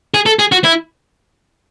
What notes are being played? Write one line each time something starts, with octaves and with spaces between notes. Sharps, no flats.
G#4
A4
G#4
F#4
E4